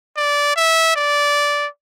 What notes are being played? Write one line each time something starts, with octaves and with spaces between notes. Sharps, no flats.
D5
E5
D5